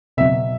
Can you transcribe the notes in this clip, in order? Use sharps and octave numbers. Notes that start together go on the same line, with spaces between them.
B2 F#3 E5